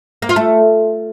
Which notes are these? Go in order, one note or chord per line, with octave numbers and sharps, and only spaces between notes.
A#3
F4
A3